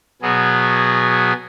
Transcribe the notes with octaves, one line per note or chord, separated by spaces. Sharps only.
B2 F#3 B3 G#4